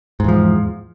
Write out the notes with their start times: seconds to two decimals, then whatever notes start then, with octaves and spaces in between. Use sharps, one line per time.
0.20 G#2
0.24 E2
0.28 F3